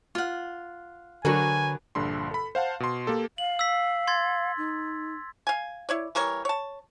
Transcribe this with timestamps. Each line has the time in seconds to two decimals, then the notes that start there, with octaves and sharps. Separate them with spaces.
0.15 F4 F#5 F6
1.25 D3 F#3 D4 F#4 A#4 B4 C#5 G#5
1.95 A#1 G2 D3 B5 C6
2.31 A4 B5
2.55 C5 F5 F#5 A5
2.80 B2 C6
3.07 A#3 G4 A4
3.38 F5 F#7
3.59 E6 B6
4.07 C6 G#6 A6
4.57 D#4
5.47 F5 G#5
5.89 E4 C#5 D5
6.15 E3 G3 A#4 C#5
6.45 C#5 A5